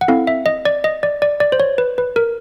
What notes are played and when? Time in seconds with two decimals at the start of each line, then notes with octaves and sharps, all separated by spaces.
0.01 F#5
0.08 C4 E4 A4 F5
0.27 E5
0.46 D#5
0.65 D5
0.84 D#5
1.03 D5
1.22 D5
1.40 D5
1.52 C5
1.60 C#5
1.78 B4
1.98 B4
2.16 A#4